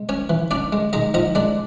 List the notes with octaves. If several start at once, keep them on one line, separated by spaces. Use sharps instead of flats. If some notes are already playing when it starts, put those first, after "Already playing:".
Already playing: G#3
C#4 C#5
E3
C#4 D4 D5
G#3
G#3 D#4 D#5
F3 D#4 D#5
G#3 D4 D5